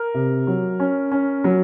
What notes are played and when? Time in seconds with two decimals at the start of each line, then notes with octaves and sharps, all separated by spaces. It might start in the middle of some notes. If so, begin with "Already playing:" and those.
Already playing: A#4
0.14 C3
0.47 F#3
0.80 C#4
1.11 C#4
1.44 F#3